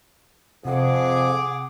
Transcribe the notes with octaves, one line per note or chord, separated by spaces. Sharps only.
F2 C3 G#4 F#5 D6